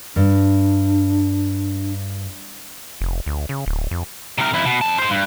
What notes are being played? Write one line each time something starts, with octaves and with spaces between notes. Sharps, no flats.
G2 D4
F1
D2
C#3
D1
F2
C3 A#4
F2 E4
B2
F2 A5
G#3 C5
G2